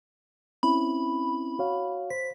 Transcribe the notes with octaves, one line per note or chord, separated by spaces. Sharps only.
C4 C#4 E4 B5
F#4 C#5 F5
C5 B6